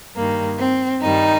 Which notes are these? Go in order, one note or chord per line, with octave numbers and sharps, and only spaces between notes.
G2 D#3 G3 A#3
C4
G2 D#3 G3 D#4